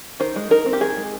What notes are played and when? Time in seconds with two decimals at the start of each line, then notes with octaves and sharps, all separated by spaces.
0.20 D#3 C5
0.36 G#3
0.50 D#4 A#4
0.66 C4
0.73 G4
0.81 D#3 G#4
0.97 G#3